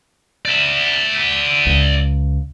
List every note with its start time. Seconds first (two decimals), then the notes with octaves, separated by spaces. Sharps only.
0.45 D5 E5
1.66 C#2